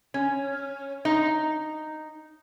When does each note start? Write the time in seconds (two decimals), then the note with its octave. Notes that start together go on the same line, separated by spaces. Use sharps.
0.14 C#4
1.05 D#4